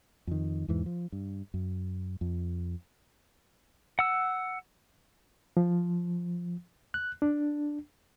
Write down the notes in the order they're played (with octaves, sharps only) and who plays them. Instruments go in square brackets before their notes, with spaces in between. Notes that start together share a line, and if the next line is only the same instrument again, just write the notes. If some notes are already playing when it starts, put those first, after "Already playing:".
[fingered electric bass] F2 D#3
E2 G#2 E3
F3
G2
F#2
F2
[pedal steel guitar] F#5 E6
[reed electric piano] F3
F#6
D4